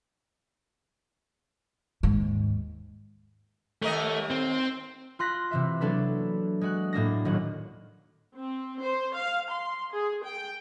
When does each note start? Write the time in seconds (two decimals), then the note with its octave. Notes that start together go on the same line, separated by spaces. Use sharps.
2.03 D#2 G#2
3.82 D#2 A3 A#4 D#5
4.30 C4
5.19 F4 C6 F#6 A#6 B6
5.51 C3 E3 E5
5.81 F#3 A#3 B3 D4 A4 B4
6.61 G#3 F#4 F#6
6.93 A2 A#3 D4 A#6
7.25 D#1 D#3 F#3 F#5
8.36 C4
8.82 C5
9.16 F5
9.50 C6
9.93 G#4
10.24 G5